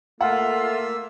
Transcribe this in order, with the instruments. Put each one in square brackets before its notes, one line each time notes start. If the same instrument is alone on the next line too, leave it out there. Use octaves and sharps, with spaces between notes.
[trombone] A3 [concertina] A#3 E5 E6 [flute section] F4 [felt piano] F#5